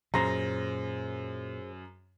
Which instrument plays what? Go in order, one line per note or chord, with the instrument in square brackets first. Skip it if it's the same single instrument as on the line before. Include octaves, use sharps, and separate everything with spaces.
[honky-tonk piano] F#2 A#6 [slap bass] A#2 [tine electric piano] G#4 C5 [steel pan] A#5 C6